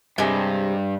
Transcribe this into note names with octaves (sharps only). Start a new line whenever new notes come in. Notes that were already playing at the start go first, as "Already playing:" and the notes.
G2 C3 G#3